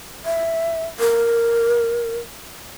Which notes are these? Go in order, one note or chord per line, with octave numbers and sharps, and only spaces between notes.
E5
A#4